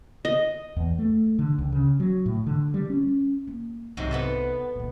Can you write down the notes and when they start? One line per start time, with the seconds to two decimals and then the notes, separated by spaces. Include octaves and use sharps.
0.25 D#5
0.76 E2
0.98 A3
1.39 D3
1.58 C#2
1.72 C#3
2.00 F#3
2.26 A2
2.46 D3
2.74 G3
2.90 C#4
3.47 A#3
3.97 C2 G#2 C3 F#3
4.11 B3 E4 A4
4.75 A#2 D#3